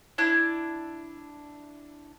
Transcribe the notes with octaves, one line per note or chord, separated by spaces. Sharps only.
D4 E4 F#6